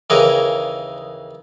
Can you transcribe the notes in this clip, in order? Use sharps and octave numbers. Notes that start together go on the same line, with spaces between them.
D#2 C#3 E3 G#4 A#4